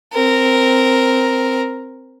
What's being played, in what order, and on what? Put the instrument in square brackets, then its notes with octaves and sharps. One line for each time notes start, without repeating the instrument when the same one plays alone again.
[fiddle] C4 A#4